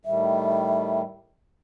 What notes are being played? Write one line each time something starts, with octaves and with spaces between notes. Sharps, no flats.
A2 D#3 G3 E5